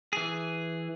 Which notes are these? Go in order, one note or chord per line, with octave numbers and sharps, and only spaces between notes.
E3 G#4